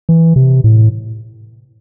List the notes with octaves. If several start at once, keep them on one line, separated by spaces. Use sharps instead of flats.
E3
C3
A2